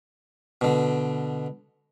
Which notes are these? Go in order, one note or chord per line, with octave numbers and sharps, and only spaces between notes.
B2 D3